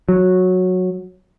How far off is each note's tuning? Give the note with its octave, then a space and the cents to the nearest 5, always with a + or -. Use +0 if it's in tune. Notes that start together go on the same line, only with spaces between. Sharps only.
F#3 -10